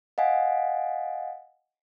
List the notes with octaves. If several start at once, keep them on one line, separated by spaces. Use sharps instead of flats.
D#5 F5 F#5 G#5